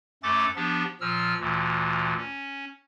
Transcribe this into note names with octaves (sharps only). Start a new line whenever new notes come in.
F#2 A3 C#4 A4 D6 A6
F3 B3 D4 G4
A#2 F3 E6 F6
D2 A#2 E3
C#4